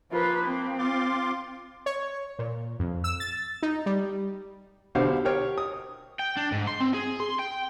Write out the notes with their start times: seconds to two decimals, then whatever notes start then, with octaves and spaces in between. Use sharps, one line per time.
0.12 F3 A#3 F4 B4
0.46 C4
0.78 F4 C6 D6
1.86 C#5
2.39 A#2
2.80 F2
3.04 E6
3.20 A6
3.63 D#4
3.86 G3
4.95 B1 D3 G4 C5 F5
5.25 G4 A#4 C5 C#5 G5 F6
5.58 D#6
6.19 G5
6.37 D4
6.52 G#2
6.67 C6
6.80 C4
6.94 G#4
7.20 C6
7.39 G5